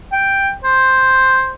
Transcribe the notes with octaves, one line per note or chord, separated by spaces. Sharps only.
G5
C5